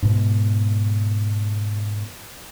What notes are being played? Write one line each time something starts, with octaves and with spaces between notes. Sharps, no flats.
G#2 B2